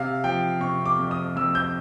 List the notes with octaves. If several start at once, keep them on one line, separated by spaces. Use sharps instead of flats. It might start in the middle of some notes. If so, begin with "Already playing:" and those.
Already playing: C3 F5
F3 G5
C3 C#6
D6
F2
D#6
F2 E6
G6